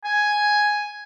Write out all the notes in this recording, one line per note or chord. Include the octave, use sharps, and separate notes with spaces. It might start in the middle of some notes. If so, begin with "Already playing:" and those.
G#5